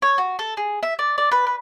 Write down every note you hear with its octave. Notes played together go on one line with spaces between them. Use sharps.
C#5
F#4
A4
G#4
E5
D5
D5
B4
B4